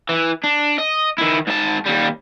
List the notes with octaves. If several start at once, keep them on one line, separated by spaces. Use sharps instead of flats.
E3
D4
D#5
D#3 E4
G#2 A5
D#2 G3